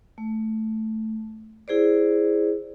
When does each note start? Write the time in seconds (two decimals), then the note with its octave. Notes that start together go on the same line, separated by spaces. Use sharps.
0.18 A3
1.68 E4 G#4 C5 D5